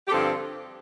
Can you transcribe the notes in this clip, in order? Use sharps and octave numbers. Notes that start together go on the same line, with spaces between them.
G4
G2 D3 F3 C4 A4